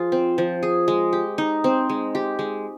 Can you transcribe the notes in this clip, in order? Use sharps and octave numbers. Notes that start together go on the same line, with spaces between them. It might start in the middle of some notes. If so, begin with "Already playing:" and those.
Already playing: F3 F4 G#4
C4
F3
G#4
G#3
G4
D#4
C4
G#3
G4
G#3